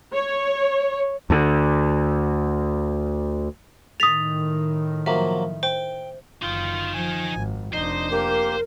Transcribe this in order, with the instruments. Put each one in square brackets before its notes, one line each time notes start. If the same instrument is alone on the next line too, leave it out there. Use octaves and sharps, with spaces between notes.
[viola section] C#5
[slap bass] D2 D3
[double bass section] A2 D#3 [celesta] D#6 F7 [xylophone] A6 B6
[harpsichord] F3 F#3 A#3 [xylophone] E5
[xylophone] C5 [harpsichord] G5
[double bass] F#1 [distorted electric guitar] D#4 G5 [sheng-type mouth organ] F4
[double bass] F3 [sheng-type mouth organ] G#5
[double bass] G#1
[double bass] F1 D4 [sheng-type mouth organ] D#4 D#5 [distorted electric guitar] C5
[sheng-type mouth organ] A#3 G4 [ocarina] A#4